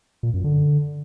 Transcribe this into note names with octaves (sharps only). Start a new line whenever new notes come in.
A#2
F#2
D3